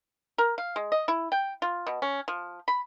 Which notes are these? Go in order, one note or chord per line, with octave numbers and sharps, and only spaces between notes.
A#4
F5
G#3
D#5
E4
G5
F4
B2
C#4
F3
B5